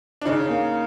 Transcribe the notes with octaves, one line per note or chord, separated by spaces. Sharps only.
D4
C#3 C#4 D#4
A#3